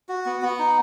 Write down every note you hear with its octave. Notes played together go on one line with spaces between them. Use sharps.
F#4
B3
B3
D#4